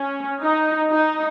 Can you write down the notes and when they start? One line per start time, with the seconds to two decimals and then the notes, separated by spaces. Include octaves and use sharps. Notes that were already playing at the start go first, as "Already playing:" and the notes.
Already playing: C#4
0.41 D#4
0.90 D#4